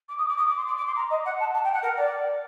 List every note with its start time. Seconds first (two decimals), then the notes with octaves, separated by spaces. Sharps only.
0.08 D6
0.18 D#6
0.28 D6
0.37 D#6
0.48 D6
0.57 C6
0.67 D6
0.77 D6
0.86 C6
0.96 A#5
1.10 D#5
1.25 F#5
1.39 A5
1.54 A5
1.64 G5
1.73 F#5
1.82 A#4
1.97 D5